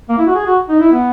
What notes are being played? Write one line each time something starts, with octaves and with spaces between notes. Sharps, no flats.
A#3
E4
F#4
G#4
F#4
D#4
E4
B3